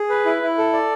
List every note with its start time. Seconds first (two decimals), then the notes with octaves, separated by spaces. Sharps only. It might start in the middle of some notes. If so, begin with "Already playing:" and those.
Already playing: G#4
0.09 B4
0.25 E4
0.42 E4
0.58 A4
0.73 D5